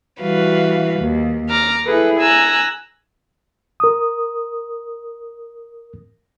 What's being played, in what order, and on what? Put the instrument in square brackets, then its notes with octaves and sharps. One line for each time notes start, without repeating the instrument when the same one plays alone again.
[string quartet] E3 G3 F#4 B4 F5
D#2
A#5 D6 F6
E4 G#4 A4 B4
G#5 A#5 E6 F#6
[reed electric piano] A#4 D#6